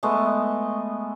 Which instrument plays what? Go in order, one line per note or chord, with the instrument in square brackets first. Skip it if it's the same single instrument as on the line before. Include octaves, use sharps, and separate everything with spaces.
[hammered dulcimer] G#3 A3 B3 D#5